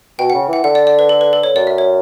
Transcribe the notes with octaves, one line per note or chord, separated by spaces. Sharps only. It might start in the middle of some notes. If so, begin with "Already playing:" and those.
B2 G5
F#5
C#3
E3 F#5
D3 F#5
D5
D5
B4
A4
B4
A4
C#5
F#2 D5
E5
C#5